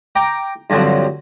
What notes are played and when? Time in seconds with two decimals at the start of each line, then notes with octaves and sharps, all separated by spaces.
0.16 G5 A#5 D6
0.70 G2 D3 F3 F#3 C4